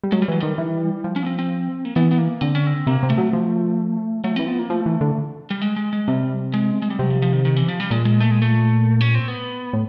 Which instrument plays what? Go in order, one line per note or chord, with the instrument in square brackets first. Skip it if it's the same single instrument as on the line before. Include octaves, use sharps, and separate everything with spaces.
[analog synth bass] G3
[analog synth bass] F#3 [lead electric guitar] G#3
[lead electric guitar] G3
[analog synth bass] E3 [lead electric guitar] F#3
[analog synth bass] D#3 [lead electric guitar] G3
[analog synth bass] E3
F3
[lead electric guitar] C#4
B3
C4
C4
A#3
[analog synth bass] E3 [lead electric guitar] B3
[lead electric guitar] B3
A#3
[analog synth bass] D3 [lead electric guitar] C4
[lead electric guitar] C#4
C4
[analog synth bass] C3 [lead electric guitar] A#3
[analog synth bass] C3
[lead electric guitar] A3
[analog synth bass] F#3
F3
[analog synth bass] F#3 [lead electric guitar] A3
[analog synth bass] F3
[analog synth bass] E3 [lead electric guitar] C4
[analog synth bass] F3 [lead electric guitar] B3
[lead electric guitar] A#3
[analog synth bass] F3 [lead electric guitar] A3
[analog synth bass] E3
D3
[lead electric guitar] G3
G#3
G#3
G#3
[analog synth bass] C3 [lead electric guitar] G3
[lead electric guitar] G#3
G#3
G3
[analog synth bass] C3 [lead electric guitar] F#3
[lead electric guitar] F3
F3
D#3
D#3
E3
F3
G3
[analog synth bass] A#2 [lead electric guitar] G#3
[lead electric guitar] G#3
A3
G#3
A3
C#4
C4
B3
[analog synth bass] A2